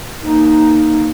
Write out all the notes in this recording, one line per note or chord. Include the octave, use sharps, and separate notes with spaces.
A#3 D#4